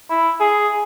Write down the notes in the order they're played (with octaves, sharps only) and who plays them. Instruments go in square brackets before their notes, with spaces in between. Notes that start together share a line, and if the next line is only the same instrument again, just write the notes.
[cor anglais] E4
G#4